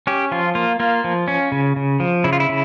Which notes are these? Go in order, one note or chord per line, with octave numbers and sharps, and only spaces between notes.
C#4 G4
F3 F4
A#3 F4
A#3 F4
F3
C#4
C#3
C#3
F3
C#3 E4
F4
E4
C#3